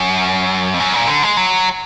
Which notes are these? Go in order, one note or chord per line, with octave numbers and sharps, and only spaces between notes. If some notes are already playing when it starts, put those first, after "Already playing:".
Already playing: F#2
F2
F#2
A#2
D3
G#3
F#3